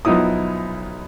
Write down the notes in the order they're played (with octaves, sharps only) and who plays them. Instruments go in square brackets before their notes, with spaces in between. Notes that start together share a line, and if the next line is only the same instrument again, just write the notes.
[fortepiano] B1 F3 B3 D#4 E4 D#6